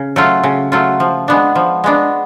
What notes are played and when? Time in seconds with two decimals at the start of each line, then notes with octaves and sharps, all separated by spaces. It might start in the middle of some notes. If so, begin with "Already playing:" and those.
Already playing: C#3
0.16 F#3 A3 F4
0.43 C#3
0.72 F#3 A3 F4
1.00 F3
1.28 G#3 B3 D4
1.55 F3
1.84 G#3 B3 D4